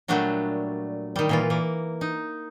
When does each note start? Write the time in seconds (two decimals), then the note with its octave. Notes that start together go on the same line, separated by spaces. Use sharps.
0.08 A#2 F#3 G3 A3 D4 F#4
1.16 D#3 G3
1.29 A#2 E3 F4
1.50 E3 A#3
2.01 D#4